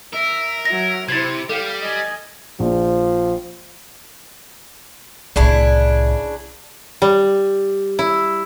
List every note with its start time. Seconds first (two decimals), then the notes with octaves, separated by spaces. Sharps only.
0.13 A#4 E5
0.65 F#3 E5 A#6
1.09 C3 E4 C5 G#6 A6
1.49 G3 A4 F5 G5
1.81 D#5 G#5
2.60 A#1 F3
5.36 C2 A2 C#3 D4 E4
7.02 G3
7.99 E4